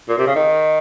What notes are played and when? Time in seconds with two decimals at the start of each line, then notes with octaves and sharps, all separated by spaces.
0.09 A#2
0.18 C3
0.27 C#3
0.35 D#3